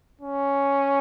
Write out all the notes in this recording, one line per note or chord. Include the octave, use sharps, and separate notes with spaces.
C#4